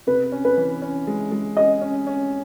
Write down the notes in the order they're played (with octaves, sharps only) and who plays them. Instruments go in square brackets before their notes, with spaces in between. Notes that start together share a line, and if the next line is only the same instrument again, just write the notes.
[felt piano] C3 [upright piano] B4
[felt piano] C#4
[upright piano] B4
[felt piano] E3
C#4
G#3
G#3
[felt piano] C#4 [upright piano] D#5
[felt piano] C#4
C#4